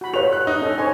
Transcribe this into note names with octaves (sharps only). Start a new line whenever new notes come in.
F#4 B5
F4 G4 B4 C#5 F#5 F7
F#6
D#4
C#4 A4
C5 C#5 G#5